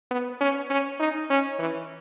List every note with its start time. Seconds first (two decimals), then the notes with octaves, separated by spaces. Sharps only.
0.11 B3
0.40 C#4
0.70 C#4
1.00 D#4
1.30 C#4
1.59 E3